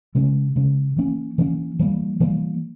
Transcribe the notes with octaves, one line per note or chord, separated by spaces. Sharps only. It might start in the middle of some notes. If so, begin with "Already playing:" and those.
C#3 G#3 C#4
C#3 G#3 C#4
E3 A#3 C#4
E3 A#3 C#4
E3 G3 A#3
E3 G3 A#3